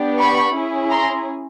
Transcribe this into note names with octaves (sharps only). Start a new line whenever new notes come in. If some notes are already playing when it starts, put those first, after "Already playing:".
Already playing: B3 D4 G4
B5 C#6
C#4 E4 G#4
A#5 C6